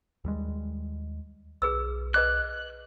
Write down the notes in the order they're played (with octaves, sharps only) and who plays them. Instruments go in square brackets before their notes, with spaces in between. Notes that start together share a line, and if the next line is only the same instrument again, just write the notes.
[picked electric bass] D#2 G3 G#3
[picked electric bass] B1 [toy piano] G#4 B4 E6
[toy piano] B4 D#5 D6 [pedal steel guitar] F#6